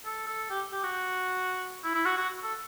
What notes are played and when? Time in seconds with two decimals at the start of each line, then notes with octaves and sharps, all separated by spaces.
0.05 A4
0.27 A4
0.50 G4
0.72 G4
0.83 F#4
1.84 E4
1.95 E4
2.06 F#4
2.17 F#4
2.43 A4